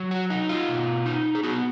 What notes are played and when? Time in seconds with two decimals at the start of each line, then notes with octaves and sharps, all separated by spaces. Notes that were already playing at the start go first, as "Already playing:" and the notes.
Already playing: F#3
0.11 F#4
0.30 D#4
0.49 F4
0.68 B2
1.06 D#4
1.35 G#4
1.43 B3 F#4